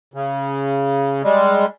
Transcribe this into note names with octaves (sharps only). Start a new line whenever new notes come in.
C#3
G3 G#3